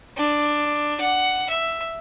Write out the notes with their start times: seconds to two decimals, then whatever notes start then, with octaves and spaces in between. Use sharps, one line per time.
0.17 D4
1.00 F#5
1.49 E5